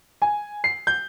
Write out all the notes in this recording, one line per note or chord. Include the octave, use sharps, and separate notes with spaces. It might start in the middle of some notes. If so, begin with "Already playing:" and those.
G#5
C7
G6